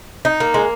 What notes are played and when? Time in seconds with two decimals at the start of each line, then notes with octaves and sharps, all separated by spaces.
0.25 D#4
0.40 A#3
0.54 G#3